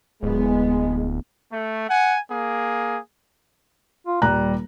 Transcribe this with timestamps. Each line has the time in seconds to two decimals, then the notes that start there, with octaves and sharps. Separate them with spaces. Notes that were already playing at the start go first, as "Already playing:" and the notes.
0.23 D1 G#3 B3
1.51 A3
1.89 F#5 G#5
2.30 A#3 G#4
4.07 F4
4.22 D#1 G3 A#5 F#6